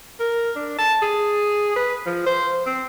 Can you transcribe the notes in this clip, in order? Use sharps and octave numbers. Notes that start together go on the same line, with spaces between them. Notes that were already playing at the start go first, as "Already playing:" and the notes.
A#4
D4
A5
G#4
B4
F3
C5
C4